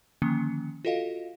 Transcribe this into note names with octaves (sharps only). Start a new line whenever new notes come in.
D3 D#3 F3 A#3 C#4 C#7
F4 F#4 A4 D#5 F5